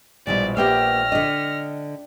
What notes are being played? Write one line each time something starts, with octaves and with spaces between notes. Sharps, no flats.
A#1 B2 G3 G#3 E4 D5
A#3 B3 G4 E5 G5 F6 G6 A#6
D3 D4 D#5 B6 C#7